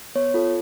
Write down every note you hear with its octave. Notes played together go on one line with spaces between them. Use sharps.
B3 C#5
F4 A4